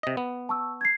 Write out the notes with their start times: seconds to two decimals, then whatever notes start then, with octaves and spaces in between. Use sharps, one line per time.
0.03 C3 D#5
0.17 B3
0.49 A5 C#6 E6
0.81 G#6 C7